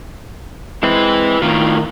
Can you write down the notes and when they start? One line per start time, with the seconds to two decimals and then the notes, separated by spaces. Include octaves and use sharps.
0.83 G#3 C4 E4 B4
1.42 A2 D#3 F4